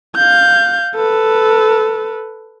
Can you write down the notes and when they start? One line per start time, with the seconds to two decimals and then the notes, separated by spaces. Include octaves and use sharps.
0.17 F5 G6
0.96 A4 B4